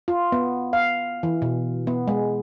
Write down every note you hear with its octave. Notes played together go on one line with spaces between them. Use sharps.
F4
B3
F5
E3
B2
B3
G#3